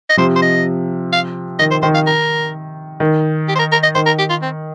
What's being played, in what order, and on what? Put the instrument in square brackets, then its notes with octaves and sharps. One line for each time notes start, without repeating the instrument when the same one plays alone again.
[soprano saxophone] D#5
[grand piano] C3 F3 [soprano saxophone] C5
[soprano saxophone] C5
D#5
F5
[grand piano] D#3 [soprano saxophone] D#5
[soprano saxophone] C5
[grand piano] D#3 [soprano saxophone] C5
[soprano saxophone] F5
A#4
[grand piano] D#3
[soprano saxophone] G4
C5
A#4
A#4
D#5
[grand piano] D#3 [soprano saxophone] C5
[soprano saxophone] A#4
G4
F4
C4